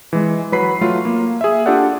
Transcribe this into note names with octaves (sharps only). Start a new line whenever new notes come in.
E3 G#3
F#3 B4 B5 C7
F#3 A3 F4
A#3
G#4 E5
D4 F4 G4 A4 D5 F#5